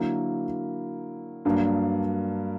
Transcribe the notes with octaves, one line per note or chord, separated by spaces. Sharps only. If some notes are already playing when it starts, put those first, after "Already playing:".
Already playing: D3 F#3 A#3 E4
G2 F#3 A#3 D4